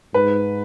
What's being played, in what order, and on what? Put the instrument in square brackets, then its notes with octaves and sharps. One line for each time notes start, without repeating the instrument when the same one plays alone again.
[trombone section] G#2 [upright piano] B4